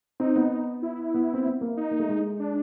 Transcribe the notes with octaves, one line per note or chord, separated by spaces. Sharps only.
C4 D#4
B3
E4
B3
C4
B3
A#3
D#4
A#3
A3
G#3
D4